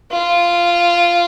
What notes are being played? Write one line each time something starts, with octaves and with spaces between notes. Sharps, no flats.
F4